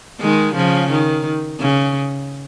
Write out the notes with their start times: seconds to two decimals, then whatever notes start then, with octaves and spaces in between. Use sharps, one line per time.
0.21 D#3 G#3
0.55 C#3 F3
0.90 D#3
1.60 C#3